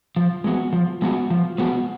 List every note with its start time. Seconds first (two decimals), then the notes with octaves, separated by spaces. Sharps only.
0.16 F3
0.44 G#3 B3 F#4
0.73 F3
1.02 G#3 B3 F#4
1.30 F3
1.58 G#3 B3 F#4